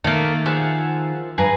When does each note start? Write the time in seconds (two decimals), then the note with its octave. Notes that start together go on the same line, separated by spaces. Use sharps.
0.04 D#3 A3 A#3
0.46 F3 G#4 E5 F#5
1.38 G2 G#4 B4 A#5